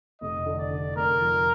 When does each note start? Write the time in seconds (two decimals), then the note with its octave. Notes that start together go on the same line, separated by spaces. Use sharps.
0.21 F1 D#5
0.46 D3
0.58 D5
0.70 D3
0.96 F1 A#4
1.20 F3